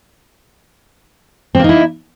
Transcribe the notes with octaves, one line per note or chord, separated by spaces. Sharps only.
A#3 C4 D#4 E4